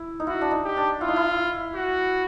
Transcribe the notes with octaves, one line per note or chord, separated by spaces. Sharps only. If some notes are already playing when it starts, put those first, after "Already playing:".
Already playing: E4
D#4
E4 F#4
D4
D#4
G4
D4
E4 F4
D#4
E4
F#4